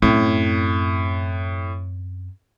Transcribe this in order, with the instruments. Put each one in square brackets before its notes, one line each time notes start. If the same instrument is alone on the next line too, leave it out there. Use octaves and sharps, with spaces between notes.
[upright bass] F#2 C4 [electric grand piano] A2